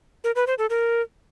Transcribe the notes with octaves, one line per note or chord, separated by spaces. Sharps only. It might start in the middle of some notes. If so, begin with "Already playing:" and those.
A#4
B4
C5
A4
A#4